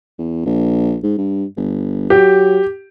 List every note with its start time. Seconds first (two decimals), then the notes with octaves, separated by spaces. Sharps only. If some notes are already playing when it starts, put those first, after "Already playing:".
0.19 E2
0.46 A#1
1.03 G#2
1.18 G2
1.57 G1
2.10 F#3 G4